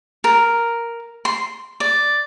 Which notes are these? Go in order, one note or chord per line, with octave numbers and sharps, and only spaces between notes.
A#4
C6
D5